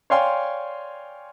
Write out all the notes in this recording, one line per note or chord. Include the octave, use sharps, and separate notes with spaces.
C#5 D5 F5 G5 G#5 C6